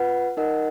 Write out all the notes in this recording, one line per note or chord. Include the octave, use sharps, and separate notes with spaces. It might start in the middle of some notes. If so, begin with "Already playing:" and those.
Already playing: F4 B4 F#5
D#4 A#4 D#5 F#5